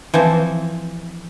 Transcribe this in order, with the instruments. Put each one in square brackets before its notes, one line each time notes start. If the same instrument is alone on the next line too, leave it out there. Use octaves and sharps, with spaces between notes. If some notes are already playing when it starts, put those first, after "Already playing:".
[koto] E3 F3 C4